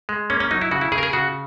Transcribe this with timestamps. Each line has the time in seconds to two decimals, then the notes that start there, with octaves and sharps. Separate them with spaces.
0.09 G#3
0.30 A#3 C#4
0.40 C#4
0.51 F#3 D#4
0.62 E4
0.71 C#3 F#4
0.81 E4
0.92 C#3 G#4
0.98 A#4
1.03 G#4
1.13 C#3 F#4